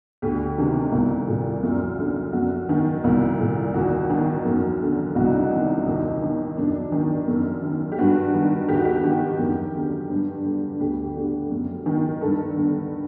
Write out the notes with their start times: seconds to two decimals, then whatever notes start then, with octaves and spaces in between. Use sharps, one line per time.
0.22 D2 G4
0.58 C3 D#3
0.92 C2
1.28 A#2
1.63 F#2
1.98 D3
2.33 F#2 F#4
2.69 D#3
3.04 C2
3.40 A#2
3.74 D#2 F#4
4.10 D#3
4.45 F#2
4.81 D3
5.15 C2 F#4
5.25 D#4
5.34 D4
5.43 D#4
5.51 C3 D#3
5.87 D#2
6.22 D#3
6.57 F#2 D4
6.92 D#3
7.28 F#2
7.63 D#3
7.92 G4
7.98 G2 F#4
8.34 D#3
8.69 D#2 G4
8.77 F#4
8.85 G4
9.04 D#3
9.39 F#2
9.75 D3
10.10 G2
10.45 D3
10.80 D2 G4
11.16 D3
11.50 F#2
11.86 D#3
12.21 G2 A4
12.57 D3